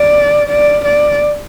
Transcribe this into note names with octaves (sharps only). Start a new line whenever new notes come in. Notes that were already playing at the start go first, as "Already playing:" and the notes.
Already playing: D5
D5
D5